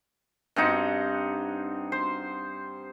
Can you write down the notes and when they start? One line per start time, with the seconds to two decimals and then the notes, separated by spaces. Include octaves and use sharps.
0.56 G2 C4 D#4 F#5
1.92 C5